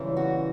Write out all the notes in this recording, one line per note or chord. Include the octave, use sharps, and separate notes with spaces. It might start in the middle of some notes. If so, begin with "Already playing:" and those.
Already playing: F#2 C#3 E3 G3
F#4